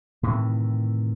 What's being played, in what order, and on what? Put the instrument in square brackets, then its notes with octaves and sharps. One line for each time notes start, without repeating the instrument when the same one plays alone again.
[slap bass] A2 C3 D#3 E3